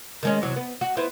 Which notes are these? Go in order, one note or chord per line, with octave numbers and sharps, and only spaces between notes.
D#3 G#3 C#4
E2 C3 F#3
B3
F#4
B3 E4 C5